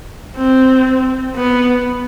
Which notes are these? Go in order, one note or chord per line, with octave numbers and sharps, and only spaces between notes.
C4
B3